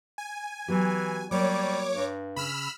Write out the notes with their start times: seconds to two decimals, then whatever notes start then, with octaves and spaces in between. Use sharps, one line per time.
0.18 G#5
0.68 E3 F#3 B3 G4
1.31 F#3 G3 A#3 C#5 D6
1.94 G2
2.36 C#3 B5 E6 F6